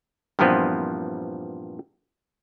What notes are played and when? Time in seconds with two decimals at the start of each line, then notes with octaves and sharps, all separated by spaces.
0.39 G2 A#2 E3 F3 B3 C4